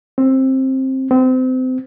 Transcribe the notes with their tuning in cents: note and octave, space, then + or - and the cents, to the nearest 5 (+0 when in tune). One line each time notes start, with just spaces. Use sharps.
C4 +15
C4 -30